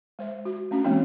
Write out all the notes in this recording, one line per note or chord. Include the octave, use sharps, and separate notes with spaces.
G#3 C5 E5
F#4
A3 C#4 D4 F#4
E3 G#3 A#3 C4 D#4